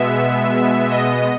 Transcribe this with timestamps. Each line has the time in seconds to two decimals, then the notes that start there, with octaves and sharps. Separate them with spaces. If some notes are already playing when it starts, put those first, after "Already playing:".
Already playing: B2 G#3 B3 E5
0.90 D#5